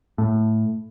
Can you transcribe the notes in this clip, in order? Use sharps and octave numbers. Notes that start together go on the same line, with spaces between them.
A2